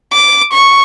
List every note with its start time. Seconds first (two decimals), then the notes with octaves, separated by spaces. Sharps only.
0.13 D6
0.53 C#6